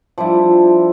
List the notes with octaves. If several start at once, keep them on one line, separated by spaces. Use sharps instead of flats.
F3 G3 D4 E4